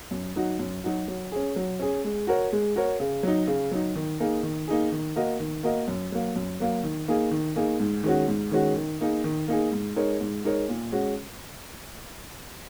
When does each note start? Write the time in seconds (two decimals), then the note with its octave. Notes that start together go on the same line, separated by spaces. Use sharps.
0.11 F#2
0.36 F#3 D#4 F#4
0.59 F#2
0.84 F#3 D#4 F#4
1.08 F#3
1.32 C#4 G#4
1.56 F#3
1.79 C#4 G#4
2.04 G#3
2.27 F#4 A#4 C#5
2.52 G#3
2.76 F#4 A#4 C#5
3.00 C#3
3.23 F#3 D#4
3.48 C#3
3.71 F#3 D#4
3.96 D#3
4.20 A#3 D#4 G#4
4.43 D#3
4.68 A#3 D#4 G#4
4.92 D#3
5.16 A#3 F#4 A#4 D#5
5.40 D#3
5.63 A#3 F#4 A#4 D#5
5.88 F#2
6.12 F#3 A#3
6.36 F#2
6.60 F#3 A#3
6.83 D#3
7.08 A#3 D#4 G#4
7.31 D#3
7.56 A#3 D#4 G#4
7.80 G#2
8.04 D#3 G#3 C#4 F#4
8.28 G#2
8.51 D#3 G#3 C#4 F#4
8.76 D#3
9.01 A#3 D#4 G#4
9.24 D#3
9.48 A#3 D#4 G#4
9.72 G#2
9.96 G#3 D#4 A#4 C#5
10.21 G#2
10.44 G#3 D#4 A#4 C#5
10.69 A#2
10.92 G#3 C#4 F#4